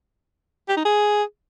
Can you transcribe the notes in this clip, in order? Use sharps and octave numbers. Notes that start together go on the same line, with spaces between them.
G4
D#4
G#4